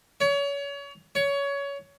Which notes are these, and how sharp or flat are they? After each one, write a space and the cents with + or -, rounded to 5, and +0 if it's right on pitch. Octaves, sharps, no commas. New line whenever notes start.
C#5 +30
C#5 +20